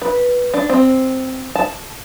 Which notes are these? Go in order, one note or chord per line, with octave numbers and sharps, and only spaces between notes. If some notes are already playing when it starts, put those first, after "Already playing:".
B4
D4
C4
A5